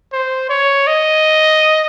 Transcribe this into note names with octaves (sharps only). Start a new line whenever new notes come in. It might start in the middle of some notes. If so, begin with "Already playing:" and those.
C5
C#5
D#5